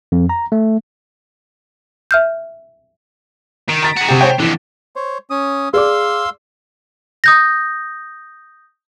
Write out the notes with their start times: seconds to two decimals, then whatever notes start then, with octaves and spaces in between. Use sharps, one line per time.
0.12 F2
0.29 A#5
0.52 A3
2.11 E5 F6 G6
3.69 D#3 D7
3.82 A#5 A6 B6
3.96 F#4 G#4
4.09 C3 G4
4.21 C5 C#5 G5
4.40 F2 D3 E3
4.96 C5 C#5
5.30 C#4 D#6
5.74 G#4 D5 F5 C6 D6 E6
7.24 D#6 G6 A#6